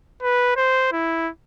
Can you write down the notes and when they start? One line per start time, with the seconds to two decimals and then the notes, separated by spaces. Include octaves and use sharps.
0.22 B4
0.57 C5
0.92 E4